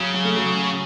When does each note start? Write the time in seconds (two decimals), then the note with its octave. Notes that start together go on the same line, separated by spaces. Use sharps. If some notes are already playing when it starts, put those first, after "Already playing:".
Already playing: C#3 F#3
0.14 F#3
0.25 A3
0.36 F#3